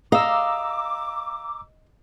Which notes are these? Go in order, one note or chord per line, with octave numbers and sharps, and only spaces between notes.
D#5 F5 A#5 D6 E6